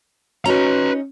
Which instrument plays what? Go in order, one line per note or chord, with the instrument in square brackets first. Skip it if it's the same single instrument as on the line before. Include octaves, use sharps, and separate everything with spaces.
[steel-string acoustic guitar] C#4 D#4 [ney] F#4 [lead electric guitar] B4 A#5